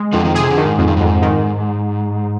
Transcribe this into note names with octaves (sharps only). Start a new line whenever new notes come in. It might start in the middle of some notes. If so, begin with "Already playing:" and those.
Already playing: G#3
F2 D3 F3
D#3
C3 G#4
D3
D#3
G#2
F2 G#2
G2
F2 G#2
D#3